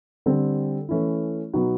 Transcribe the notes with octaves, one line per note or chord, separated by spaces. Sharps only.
D3 G3 C4
E3 A3 C#4 E4
B2 F#3 B3 D#4 F#4